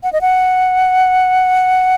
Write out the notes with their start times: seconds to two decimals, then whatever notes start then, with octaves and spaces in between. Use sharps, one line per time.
0.03 F#5
0.13 D#5
0.21 F#5